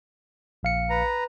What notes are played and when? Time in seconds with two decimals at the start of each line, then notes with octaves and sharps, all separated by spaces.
0.63 A#1 F5 C#7
0.90 B4 A#5